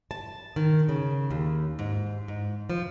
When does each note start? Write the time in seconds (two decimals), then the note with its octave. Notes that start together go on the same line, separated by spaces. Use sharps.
0.11 A5
0.56 D#3
0.89 C#3
1.31 D#2
1.79 G#2
2.28 G#2
2.70 F3